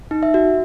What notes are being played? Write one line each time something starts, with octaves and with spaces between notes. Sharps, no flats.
D#4
E5
F#4